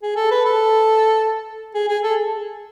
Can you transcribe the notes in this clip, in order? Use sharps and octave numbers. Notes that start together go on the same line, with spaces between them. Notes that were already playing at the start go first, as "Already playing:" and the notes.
G#4
A4
B4
A4
G#4
G#4
A4